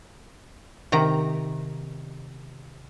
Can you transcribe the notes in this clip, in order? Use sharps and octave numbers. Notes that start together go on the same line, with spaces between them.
C3 D#3 A#5